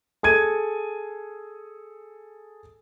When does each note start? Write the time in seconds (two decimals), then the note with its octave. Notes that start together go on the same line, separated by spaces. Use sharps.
0.23 G#4 A4 G#6 D#7